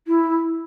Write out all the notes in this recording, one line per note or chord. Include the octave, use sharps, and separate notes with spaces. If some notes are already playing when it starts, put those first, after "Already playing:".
E4